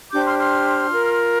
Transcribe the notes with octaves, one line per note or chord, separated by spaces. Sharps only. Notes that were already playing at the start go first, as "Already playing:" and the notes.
D4 G4 C5 D6 G6
C6 F6
C6 F6
F4 A#4